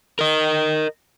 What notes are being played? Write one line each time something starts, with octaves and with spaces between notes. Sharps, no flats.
A#4 D#5